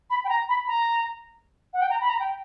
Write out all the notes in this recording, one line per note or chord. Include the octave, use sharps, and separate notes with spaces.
B5
G5
A#5
B5
A#5
F#5
G5
A#5
B5
A#5
G5